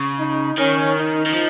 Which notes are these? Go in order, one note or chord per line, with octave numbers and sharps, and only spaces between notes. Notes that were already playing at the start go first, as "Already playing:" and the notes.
Already playing: C#3
D#4
D#3 C#4
D#4
D#3
F3